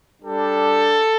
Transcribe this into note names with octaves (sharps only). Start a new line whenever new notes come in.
G3 D4 G4 A4